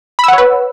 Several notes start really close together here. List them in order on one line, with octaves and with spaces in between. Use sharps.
B5 E6 F#5 C#5 B4